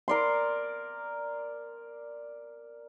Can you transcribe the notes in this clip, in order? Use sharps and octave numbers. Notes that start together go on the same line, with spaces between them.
A#4 D5 C6